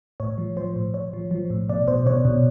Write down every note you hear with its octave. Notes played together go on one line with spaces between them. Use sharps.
A2 C#5
F3
F3 C5
A2
A2 C#5
F3
F3
A2
B2 D5
B2 C5
B2 C#5
B2